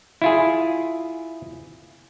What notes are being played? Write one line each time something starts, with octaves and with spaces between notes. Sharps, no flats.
E4 F4 G#4